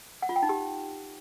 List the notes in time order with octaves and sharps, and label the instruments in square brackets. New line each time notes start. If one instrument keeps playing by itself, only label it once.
[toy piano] F#5
F4
G5
D#4
G4